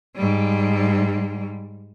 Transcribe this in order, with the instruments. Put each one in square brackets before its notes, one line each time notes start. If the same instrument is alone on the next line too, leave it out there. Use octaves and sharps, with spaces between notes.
[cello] G#2 G3